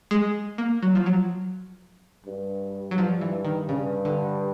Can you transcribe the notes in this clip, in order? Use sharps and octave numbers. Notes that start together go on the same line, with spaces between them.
G#3
A#3
F#3
F3
F#3
G2
F#3
G2 F3
E3
D#3
G2 C#3
D3